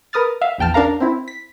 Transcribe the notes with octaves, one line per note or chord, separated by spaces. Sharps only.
A#4 B4 D#6 F6 A6
E5 F5
A#1 E2 G5 A5 F6
D4 A#4 F5 A#5
C4 E4
B6